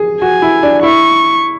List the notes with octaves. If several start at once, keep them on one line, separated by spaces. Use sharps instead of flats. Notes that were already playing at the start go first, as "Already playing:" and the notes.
Already playing: G#4
F#4 G#5
E4
D4
E4 C#6